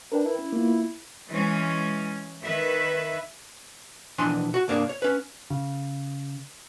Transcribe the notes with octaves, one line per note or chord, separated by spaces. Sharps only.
D4 A#4 B4 G5
E4
C#4
A#3 B3 F4
E3 G#3 C#4
D#3 B4 E5
B2 E3 F3 D4 G#5 C6
F#4
C2 G2 A#3 D4 G#4
C#5
C#4 B4
C#3